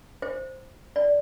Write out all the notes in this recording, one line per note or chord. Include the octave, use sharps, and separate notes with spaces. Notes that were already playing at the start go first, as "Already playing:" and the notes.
C5
D5